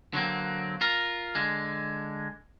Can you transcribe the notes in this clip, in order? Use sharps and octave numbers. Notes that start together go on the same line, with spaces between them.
D3 F#3 A#3 C4
F4 A#4
D3 G#3